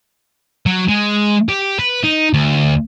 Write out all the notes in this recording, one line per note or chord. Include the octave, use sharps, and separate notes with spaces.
F#3
G#3
G4
B4
D#4
D2